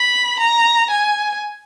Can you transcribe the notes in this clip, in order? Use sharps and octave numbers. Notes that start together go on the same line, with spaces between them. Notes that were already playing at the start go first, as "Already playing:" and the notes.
Already playing: B5
A#5
G#5